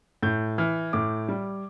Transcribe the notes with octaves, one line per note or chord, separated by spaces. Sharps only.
A2 G6
E3 F6
A2 D6
G3